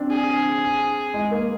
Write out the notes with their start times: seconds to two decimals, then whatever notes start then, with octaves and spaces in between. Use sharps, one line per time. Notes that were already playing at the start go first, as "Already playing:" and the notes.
Already playing: C4 D4
0.10 G#4
1.14 G#3
1.31 A#3